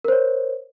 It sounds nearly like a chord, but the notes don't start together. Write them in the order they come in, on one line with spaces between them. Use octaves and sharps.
A#4 C5 C#5